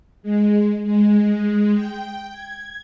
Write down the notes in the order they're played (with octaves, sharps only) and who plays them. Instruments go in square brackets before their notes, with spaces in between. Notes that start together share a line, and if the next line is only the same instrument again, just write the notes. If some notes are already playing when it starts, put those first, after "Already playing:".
[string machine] G#3
G#3
G5
G#6